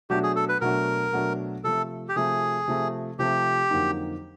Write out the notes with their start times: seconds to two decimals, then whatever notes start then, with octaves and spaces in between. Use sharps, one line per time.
0.10 B2 F#3 A3 D4 F#4 G4
0.23 G#4
0.36 A4
0.49 B4
0.61 B2 F#3 A3 D4 F#4 A#4
1.13 B2 F#3 A3 D4 F#4
1.64 C3 F3 A3 A4
2.09 G4
2.16 C3 F3 A3 G#4
2.68 C3 F3 A3
3.19 C3 F3 A3 G4
3.70 F2 D3 F#3 A#3 D#4